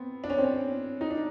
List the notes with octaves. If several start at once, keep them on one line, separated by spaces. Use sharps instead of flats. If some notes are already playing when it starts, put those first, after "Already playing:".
Already playing: B3 C4
D4
C#4
C4
C#4
D#4
D4